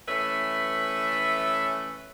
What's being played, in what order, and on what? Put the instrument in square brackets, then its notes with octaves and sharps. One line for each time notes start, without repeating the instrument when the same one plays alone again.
[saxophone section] E3 A3 C#4 B4 E5